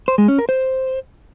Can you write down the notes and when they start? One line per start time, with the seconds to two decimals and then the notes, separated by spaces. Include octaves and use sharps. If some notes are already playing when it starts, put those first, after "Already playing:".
0.08 C5
0.18 G#3
0.28 C#4
0.38 A#4
0.49 C5